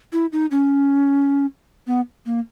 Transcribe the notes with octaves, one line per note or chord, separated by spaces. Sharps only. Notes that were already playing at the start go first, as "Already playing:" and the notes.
E4
D#4
C#4
B3
A#3